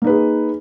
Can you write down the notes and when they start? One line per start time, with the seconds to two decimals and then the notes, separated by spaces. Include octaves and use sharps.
0.02 A#3
0.04 D#4
0.07 B4
0.09 G#4